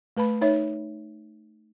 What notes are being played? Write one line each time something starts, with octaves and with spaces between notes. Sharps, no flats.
A3 B4 A5 B5
D#4 C#5 E5